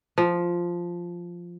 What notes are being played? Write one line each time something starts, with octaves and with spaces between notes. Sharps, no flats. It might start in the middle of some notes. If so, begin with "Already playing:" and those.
F3